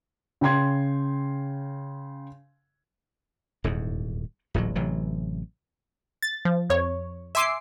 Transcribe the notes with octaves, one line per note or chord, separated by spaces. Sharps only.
C#3 G5 C6 G#6
D#1 E2 G#2
D1 A1 A#2 F#3
A1 C3 E3 F#3
A6
F3
F2 C#5
E5 G#5 C6 D6 C7